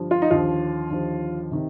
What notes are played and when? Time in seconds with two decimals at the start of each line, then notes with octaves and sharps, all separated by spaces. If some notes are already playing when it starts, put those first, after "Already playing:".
Already playing: G2 D3 F3
0.11 F4
0.22 D#4
0.31 D#2 D3 F3 F4
0.90 D#2 D3 F3
1.51 C3 D#3